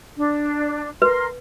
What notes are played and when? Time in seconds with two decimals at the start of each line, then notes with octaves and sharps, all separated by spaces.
0.17 D4
1.02 A#4 B4 C6